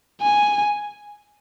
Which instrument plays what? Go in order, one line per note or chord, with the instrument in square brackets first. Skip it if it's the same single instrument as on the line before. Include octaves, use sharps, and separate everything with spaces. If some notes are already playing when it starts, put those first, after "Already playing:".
[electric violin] G#5